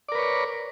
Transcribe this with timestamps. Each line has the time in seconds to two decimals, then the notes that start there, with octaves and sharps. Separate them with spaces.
0.09 D5
0.12 A#4
0.15 B4
0.18 C#5